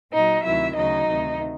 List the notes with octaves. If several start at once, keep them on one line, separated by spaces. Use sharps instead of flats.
A#2 F#3 D#4 D#5
D2 C3 D#3 F#3 E4 E5
D2 C#3 F#3 D#4 D#5
D2 C3 D#3